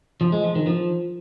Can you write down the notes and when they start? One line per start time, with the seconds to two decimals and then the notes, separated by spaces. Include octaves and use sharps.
0.21 F3
0.32 G#3
0.44 F3
0.55 D#3
0.67 F3